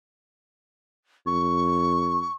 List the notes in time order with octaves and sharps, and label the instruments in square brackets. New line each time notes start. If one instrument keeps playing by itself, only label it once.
[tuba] F2 [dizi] C#6